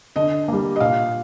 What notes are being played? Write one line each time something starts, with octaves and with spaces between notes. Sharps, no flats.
D3 D#5
G3 A#3
D#5
A#2 F5